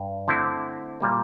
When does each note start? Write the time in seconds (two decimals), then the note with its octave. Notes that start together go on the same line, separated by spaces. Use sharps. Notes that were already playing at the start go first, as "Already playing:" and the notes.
Already playing: G2
0.28 D3 A3 C4 E4
1.00 A#2 G3 A#3